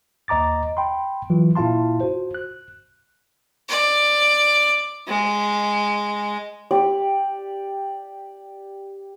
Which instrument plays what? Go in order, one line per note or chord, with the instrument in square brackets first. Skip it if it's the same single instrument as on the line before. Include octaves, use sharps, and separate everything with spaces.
[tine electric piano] D#2 D#5 A#5 D6 A6
G5 B5 C6
E3 F#3 F4
A#2 E4 F4 F5 A5 C6
F#4 C5
F#6
[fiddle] D5
G#3
[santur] G4 D5